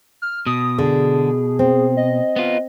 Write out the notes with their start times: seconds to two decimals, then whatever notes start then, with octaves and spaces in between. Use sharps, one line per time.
0.22 F6
0.46 B2 D#6
0.78 D3 G#4
1.59 C4
1.97 D#5
2.36 B3 F4